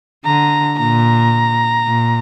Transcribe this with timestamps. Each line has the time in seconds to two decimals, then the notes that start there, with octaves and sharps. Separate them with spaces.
0.25 D3 A#5
0.79 A#2 A#5
1.87 A#2